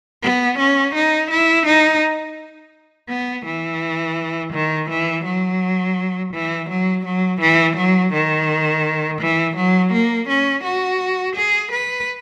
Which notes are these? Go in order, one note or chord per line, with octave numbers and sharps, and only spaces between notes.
B3
C#4
D#4
E4
D#4
B3
E3
D#3
E3
F#3
E3
F#3
F#3
E3
F#3
D#3
E3
F#3
A#3
C#4
F#4
G#4
B4